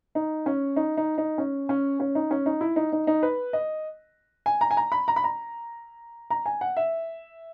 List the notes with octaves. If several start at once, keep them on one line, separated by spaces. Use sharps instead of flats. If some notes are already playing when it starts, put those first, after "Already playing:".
D#4
C#4
D#4
D#4
D#4
C#4
C#4
C#4
D#4
C#4
D#4
E4
D#4
D#4
D#4
B4
D#5
G#5
A#5
G#5
A#5
B5
A#5
B5
A#5
A#5
G#5
F#5
E5